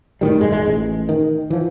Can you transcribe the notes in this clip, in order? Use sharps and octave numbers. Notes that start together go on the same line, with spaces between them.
F1 A2 D#3 G3
G#2 G#3
E1 G#3
A1
D#3
E3 F3